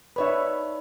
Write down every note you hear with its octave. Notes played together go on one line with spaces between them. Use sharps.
D#4 B4 C#5 D5 E5 B5